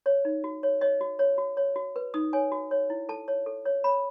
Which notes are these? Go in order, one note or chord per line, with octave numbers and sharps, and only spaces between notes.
C#5
D#4
F#4
C#5
C#5 D#5
F#4
C#5
F#4
C#5
F#4
B4
D#4 D#6
C#5 G#5
F#4
C#5
E4
A4 A5
C#5
A4
C#5
C#5 B5